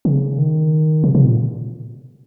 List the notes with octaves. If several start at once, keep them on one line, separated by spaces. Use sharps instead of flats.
C#3
D#3
C3
C3
A#2